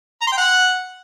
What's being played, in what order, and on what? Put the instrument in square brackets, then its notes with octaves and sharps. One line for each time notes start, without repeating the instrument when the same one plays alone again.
[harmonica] A#5
C6
G5
F#5